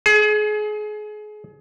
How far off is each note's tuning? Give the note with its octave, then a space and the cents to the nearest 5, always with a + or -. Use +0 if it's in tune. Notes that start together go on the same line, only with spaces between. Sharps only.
G#4 +30